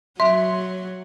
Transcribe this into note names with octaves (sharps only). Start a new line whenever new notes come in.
F#3 E5 C6